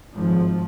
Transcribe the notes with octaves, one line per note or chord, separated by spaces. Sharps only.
G#1 G#2 F3